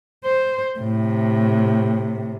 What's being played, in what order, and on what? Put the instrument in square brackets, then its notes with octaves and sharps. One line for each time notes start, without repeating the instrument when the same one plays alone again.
[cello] C5
A2 C3